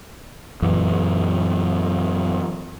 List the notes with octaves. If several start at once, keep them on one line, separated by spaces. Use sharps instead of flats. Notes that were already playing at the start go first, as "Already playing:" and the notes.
F#2 A#2 E3